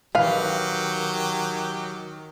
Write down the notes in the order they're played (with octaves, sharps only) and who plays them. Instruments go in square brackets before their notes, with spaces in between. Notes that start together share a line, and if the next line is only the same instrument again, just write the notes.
[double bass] D#3 [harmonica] F#3 G4 [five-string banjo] B4 F5